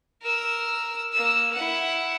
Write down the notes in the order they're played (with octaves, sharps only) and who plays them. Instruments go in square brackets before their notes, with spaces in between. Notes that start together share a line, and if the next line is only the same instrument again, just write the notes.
[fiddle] A#4 E6
A#3 E6
E4 F#5